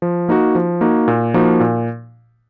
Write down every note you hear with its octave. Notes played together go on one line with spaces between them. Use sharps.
F3
A#3 D#4 F#4
F3
A#3 D#4 F#4
A#2
F3 A#3 D#4 F#4
A#2